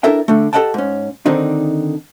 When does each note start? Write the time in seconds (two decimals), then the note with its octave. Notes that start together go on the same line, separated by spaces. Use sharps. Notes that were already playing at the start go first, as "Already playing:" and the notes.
0.03 D4 E4 A4 A#4 E5 G5
0.28 D3 A3
0.53 G4 A4 D#5 F#5 G5 A5
0.74 G#2 C#4
1.26 D3 D#3 C4 D4 D#4